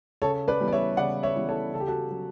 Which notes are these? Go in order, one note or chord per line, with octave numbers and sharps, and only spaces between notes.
C#3 A4 C#5
B4 D5
E3 G3 B3
D5
C#5 E5
C#3 D5 F#5
C#5 E5
E3 G3 B3
A4 C#5
C#3 A4
G4
F#4 A4
F#3 C#4